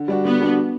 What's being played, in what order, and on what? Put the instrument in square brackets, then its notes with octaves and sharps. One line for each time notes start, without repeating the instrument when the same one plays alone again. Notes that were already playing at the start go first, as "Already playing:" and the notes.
Already playing: [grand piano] D3
G3 D4 F#4
[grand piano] D3 [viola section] B3
[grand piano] G3 D4 F#4